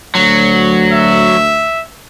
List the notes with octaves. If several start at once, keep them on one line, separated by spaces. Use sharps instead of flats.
D2 F#3
E5